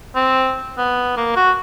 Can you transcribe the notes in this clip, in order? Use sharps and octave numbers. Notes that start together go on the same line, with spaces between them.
C4
B3
A#3
F#4